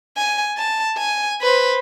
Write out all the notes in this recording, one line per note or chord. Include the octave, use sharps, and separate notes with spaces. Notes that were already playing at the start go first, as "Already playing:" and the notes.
G#5
A5
G#5
B4 C5